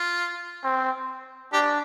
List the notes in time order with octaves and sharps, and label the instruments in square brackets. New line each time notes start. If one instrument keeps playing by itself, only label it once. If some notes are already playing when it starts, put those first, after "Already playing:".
Already playing: [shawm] F4
[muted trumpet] C4
[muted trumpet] D4 [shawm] G4